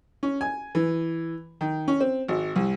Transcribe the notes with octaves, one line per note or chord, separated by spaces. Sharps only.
C#4
G#5
E3
D#3
C#4
C4
G#1
C2